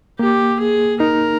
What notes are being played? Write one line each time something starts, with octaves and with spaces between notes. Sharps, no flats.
A#3 G4
G#4
D#4 A#4